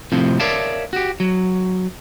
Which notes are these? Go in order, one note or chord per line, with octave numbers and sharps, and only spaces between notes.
F2 A2 C3 F3
A#4 C#5 D5 E5 F5 A5
F#4 G4
F#3